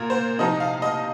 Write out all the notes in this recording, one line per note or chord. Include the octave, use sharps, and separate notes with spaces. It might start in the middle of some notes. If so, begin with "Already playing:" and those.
Already playing: A#2 A#4
C5
C3 F3 D#4 D#5
F5
D#5